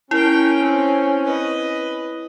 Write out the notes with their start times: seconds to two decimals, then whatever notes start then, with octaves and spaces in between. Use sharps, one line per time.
0.11 C#4 E4 A#4 G5
0.61 C4
1.24 B4 D#5